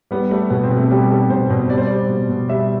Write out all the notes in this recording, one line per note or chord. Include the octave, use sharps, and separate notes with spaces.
G3 B3
G3 A3
B2 B3
C4
B2
A3
G3 G4
G3 A4
B2 C5
B2 C5
G3 D5
C5
G3 D5
B2
B2
G3 E5